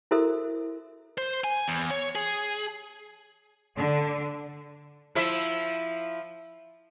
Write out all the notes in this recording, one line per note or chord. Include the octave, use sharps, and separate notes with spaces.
E4 F#4 A4 A#4 C5 E5
C5
G#5
E2
C#5
G#4
D3
F3 E4 E5